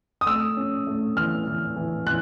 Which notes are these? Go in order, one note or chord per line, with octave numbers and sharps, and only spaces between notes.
D#6
A3 E6
C#4
A3
E3 F6
E3
E3
E3 F#6